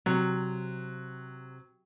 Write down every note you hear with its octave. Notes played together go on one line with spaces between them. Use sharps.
C3 F#3